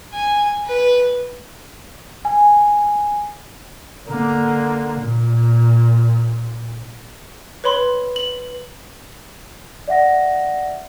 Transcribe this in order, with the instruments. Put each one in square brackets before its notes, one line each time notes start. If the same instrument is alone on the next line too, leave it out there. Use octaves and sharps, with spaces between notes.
[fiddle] G#5
B4
[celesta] G#5
[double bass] D3 A#3
A#2
[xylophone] B4 C#5 B5 C6
F#7
[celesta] D5 E5 F#5 A#6